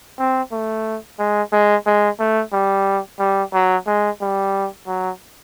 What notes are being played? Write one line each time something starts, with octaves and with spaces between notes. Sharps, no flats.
C4
A3
G#3
G#3
G#3
A3
G3
G3
F#3
G#3
G3
F#3